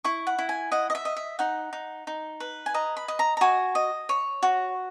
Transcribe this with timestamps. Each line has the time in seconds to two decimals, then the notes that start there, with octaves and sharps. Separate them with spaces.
0.04 E4 C#6
0.27 F#5
0.39 E4
0.49 G#5
0.72 D#5 F#5
0.90 D#5
0.95 E5
1.05 D#5
1.17 E5
1.39 D#4 F#5
1.73 D#4
2.07 D#4
2.40 B4
2.66 G#5
2.74 D#5 A#5
2.97 B5
3.08 D#5
3.19 A#5
3.37 A#5
3.41 F#4 G#5
3.75 D#5
4.09 C#5
4.43 F#4